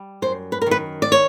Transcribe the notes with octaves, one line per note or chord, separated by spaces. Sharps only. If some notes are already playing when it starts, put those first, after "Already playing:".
Already playing: G3
F#2 C5
B4
A#4
D#3 B4
D5
C#5